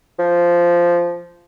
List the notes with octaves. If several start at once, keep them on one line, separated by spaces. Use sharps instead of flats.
F3